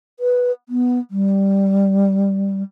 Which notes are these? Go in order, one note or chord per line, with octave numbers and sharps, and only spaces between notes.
B4
B3
G3